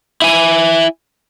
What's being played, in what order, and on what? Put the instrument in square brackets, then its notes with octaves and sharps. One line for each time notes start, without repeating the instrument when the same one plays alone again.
[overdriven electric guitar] E4 G#5